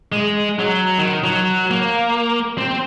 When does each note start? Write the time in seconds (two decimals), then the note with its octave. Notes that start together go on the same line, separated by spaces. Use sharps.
0.12 G#3
0.59 F#3
0.98 D#3
1.24 F#3
1.71 A#3
2.58 C4 C5